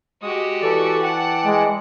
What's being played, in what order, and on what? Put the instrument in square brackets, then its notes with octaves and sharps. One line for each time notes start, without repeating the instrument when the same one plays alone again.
[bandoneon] G#3 D#6 [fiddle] F#4 G4
[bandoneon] E3 D5 [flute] A4
[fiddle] F#5 A5 [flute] G5
[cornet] G#3